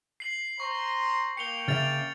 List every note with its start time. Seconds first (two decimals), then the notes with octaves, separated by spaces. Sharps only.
0.20 C7 F#7
0.60 C5 A#5 C6 C#6
1.37 A#3 G5 C#7 F7 G7
1.68 C#3 E5 F6 A6 F7